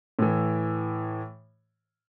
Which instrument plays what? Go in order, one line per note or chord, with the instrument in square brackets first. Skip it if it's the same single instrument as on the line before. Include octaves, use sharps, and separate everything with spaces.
[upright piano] A2 E3